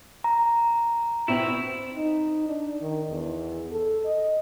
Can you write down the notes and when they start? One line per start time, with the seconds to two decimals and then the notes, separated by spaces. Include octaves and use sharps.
0.24 A#5
1.28 B2 C4 E4 F7
1.65 C4
1.95 D#4
2.48 D4
2.82 D#3
3.10 E2
3.71 A4
4.05 D#5